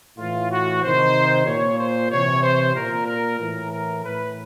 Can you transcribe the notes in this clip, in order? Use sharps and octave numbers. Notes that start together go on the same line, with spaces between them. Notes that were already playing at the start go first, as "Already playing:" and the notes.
A2 E3 F4
F#4
C3 D#3 C5
A#2 C#5
C5
C3 E3 C#5
C5
A#2 A#4
A#4
A2 E3 A#4
A#4
A2 E3 B4